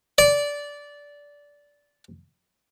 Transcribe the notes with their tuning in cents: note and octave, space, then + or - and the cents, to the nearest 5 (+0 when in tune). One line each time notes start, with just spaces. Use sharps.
D5 -15